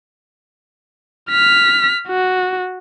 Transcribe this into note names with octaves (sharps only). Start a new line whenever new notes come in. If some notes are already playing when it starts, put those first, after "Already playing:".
F6 B6
F#4